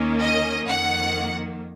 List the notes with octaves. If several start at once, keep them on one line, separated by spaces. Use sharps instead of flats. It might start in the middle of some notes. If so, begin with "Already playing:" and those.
Already playing: D#2 D#3 A#3 C#4
D#5
F2 D#3 A#3 F#5